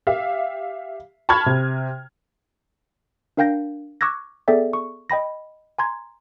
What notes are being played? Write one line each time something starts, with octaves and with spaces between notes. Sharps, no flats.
G4 E5 F5
A5 B5 C#6 F6 G#6
C3
D4 A#4 F5 G5 G6 A#6
C#6 D6 E6 F#6 G#6 A#6
B3 G#4 A4 D5 E5 G5
C#6
D#5 G5 B5 A#6
G#5 A#5 C6 G#6